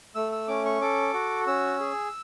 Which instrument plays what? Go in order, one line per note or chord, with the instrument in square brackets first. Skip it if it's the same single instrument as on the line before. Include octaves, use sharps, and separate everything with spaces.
[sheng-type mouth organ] A3 E6
E6
C#4 D6
C#6
A4 D6
F#4
C#4 E6
G#4